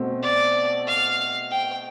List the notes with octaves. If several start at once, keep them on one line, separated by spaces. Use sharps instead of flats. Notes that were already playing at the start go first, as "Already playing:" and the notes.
Already playing: B2 A3 C4
D5
F5
G5